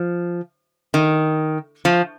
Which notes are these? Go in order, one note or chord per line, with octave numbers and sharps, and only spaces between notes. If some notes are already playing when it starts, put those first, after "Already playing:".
Already playing: F3
D#3
F3